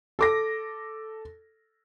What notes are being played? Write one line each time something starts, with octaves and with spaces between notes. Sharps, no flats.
A4 D6 A#6